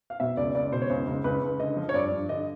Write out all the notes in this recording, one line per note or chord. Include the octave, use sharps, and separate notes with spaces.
F5
B2 E5
C#2 D5
C#2 D5
B2 C5
C#5
C#2 C5
C#2
C#2 B4
C#2
D3 D#5
F3
C#5
G2 D5
G2
D3 D#5